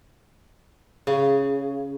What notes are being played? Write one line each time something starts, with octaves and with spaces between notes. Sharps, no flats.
C#3